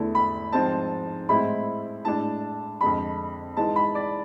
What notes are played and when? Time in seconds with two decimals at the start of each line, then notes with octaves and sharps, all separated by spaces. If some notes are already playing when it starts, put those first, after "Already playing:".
Already playing: E2 D3 A3 E4
0.15 B5
0.52 G#2 F3 G#3 C4 A5
1.29 A2 G#3 C4 E4 B5
2.05 A2 G#3 D4 A5
2.81 F2 D3 G#3 D4 B5
3.57 G#2 E3 G#3 A5
3.76 B5
3.95 D5